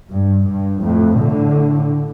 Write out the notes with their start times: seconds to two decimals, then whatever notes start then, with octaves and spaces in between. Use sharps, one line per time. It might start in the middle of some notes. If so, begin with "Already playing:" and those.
0.11 G2
0.46 G2
0.82 F2 A2
1.18 A2 D3